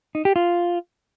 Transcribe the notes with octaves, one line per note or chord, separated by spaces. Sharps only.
D#4
G4
F4